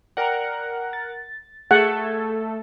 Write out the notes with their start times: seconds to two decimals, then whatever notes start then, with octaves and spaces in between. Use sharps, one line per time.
0.17 A#4 D5 F#5 G5 A#5
0.93 A6
1.71 A3 G#4 A4 F#5 G#6 A6